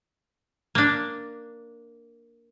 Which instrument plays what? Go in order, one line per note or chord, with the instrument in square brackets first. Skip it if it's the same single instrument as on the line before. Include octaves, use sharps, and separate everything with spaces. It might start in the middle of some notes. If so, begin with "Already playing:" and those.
[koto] A#3 D4